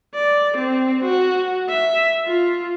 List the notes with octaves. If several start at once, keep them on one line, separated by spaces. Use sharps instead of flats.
D5
C4
F#4
E5
F4